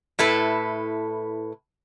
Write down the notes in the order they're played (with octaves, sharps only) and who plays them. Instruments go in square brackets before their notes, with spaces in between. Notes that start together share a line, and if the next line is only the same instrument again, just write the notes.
[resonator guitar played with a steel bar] A2 E4 A4 B4